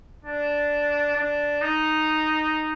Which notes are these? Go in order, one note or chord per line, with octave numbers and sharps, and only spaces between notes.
D4
D4
D#4